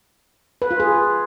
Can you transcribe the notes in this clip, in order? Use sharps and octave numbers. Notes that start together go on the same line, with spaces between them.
B4
F4
G#4